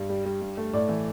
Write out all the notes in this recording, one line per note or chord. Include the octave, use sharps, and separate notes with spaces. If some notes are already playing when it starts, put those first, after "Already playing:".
Already playing: G2
G3
G3
G2
A3
A2 D5
E3